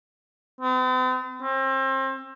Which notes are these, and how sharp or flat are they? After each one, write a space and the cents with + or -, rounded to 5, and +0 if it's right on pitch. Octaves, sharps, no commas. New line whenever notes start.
C4 -45
C4 +35